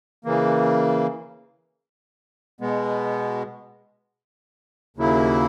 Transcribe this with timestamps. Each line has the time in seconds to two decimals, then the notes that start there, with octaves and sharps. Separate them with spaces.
0.25 C#3 E3 A#3
2.61 B2 G#3 B3
4.97 D#2 C#3 F#3 A#3 E4